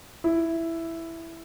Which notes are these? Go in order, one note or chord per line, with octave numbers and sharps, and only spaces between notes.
E4